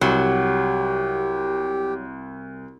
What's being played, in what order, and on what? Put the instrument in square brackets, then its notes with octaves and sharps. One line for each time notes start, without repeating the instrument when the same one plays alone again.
[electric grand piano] C2 [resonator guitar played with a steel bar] F#3 [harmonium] G4